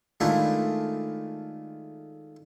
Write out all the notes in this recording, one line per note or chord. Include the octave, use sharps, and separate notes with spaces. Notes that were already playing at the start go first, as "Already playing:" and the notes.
D#3 G#3 A3 D4 E4 F4